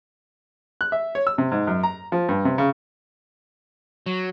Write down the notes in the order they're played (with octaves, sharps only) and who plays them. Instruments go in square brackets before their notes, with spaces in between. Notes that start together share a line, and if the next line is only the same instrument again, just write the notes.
[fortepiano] F#6
E5
C#5
E6
C3
G#2
F#2
A#5
F3
G2
C3
C#3
[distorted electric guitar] F#3